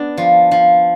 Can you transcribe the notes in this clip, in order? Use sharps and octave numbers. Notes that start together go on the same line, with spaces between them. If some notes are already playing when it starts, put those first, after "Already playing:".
Already playing: B3 D4
F3
F3